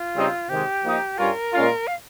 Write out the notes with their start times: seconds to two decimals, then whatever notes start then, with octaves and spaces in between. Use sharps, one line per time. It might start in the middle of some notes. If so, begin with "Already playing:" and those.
Already playing: F4
0.15 C#3 G3 C4 D#4
0.49 C3 D#3 G#3 G4
0.83 F3 A#3 D#4
1.18 G2 G3 C#4 F4 A#4
1.53 A#2 G#3 C#4 F4
1.87 F5